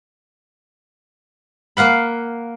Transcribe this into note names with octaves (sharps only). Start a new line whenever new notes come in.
A#3 F5 F#5 B5